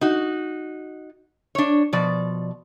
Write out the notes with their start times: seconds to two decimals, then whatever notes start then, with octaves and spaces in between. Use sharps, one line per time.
0.01 D#4 F#4
1.55 D4 C#5
1.93 B2 F3 D5